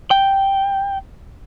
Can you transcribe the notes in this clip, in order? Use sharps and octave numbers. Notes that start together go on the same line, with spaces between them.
G5